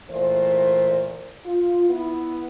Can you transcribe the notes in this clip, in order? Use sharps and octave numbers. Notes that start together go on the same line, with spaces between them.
A#2 E3 A3 C5
F4
B3 E4